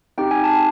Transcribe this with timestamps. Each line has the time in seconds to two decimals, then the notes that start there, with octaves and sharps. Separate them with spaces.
0.18 C4 D#4 G4 G5
0.31 G#5
0.44 A5